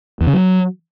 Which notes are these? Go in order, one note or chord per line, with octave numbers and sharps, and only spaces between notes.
E2
C#3
F#3